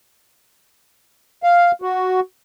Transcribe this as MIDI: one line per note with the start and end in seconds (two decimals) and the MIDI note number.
1.43 1.72 77
1.82 2.20 66